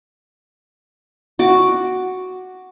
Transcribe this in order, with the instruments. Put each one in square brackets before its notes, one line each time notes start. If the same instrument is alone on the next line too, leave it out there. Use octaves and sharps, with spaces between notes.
[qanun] F#4 D6